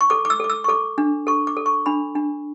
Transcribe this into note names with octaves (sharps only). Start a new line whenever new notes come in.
C#6
A4 D6
D6
E6
A4 D6
E6
C#6
A4 D6
D4
A4 C#6
D6
A4
C#6
D4 B5
D4